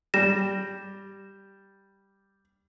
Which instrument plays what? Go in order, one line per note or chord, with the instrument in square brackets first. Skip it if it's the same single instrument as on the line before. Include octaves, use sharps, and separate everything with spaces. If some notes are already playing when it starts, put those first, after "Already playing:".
[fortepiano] G3 [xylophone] A#6 E7